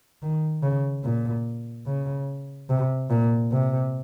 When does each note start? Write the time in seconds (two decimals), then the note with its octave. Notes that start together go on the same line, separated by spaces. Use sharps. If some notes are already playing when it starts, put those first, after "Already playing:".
0.22 D#3
0.63 C#3
1.04 A#2
1.87 C#3
2.70 C3
3.10 A#2
3.52 C3